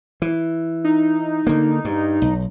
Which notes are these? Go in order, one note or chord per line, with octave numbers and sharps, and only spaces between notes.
E3
D#4
D3 A#3
G2
B1